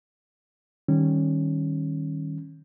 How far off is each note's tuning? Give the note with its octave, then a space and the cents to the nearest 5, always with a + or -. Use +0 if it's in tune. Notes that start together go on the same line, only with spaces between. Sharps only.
D#3 +0 G3 +0 C#4 -15